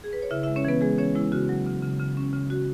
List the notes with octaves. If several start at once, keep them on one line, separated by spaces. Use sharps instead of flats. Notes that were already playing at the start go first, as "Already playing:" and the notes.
G#4
B4
C#5
C#3 E4 E5
G#3 E4 E5
C#4 C#5
E3 B3 B4
G#3 G#4
E3 C#4 C#5
G#3 E4
C#3 F#4
F#3
C#3
C#3
C#3
C#4
C#3
F#4